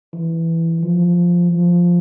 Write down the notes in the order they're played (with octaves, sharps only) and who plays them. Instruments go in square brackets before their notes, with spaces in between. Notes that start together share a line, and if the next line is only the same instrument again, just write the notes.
[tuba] E3
F3
F3